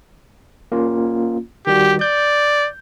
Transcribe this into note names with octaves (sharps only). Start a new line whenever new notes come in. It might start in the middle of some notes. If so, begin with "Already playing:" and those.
A#3 C#4 F4
D#3 G3 F#4 G4
D5 G6